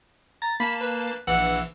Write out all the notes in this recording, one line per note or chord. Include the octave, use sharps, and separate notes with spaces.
A#5 A6
A#3 A5 B5
B4
A#1 E3 F#5 E6